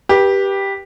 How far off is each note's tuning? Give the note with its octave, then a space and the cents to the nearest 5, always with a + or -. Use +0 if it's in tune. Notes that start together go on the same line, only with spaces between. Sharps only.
G4 +0 B4 -30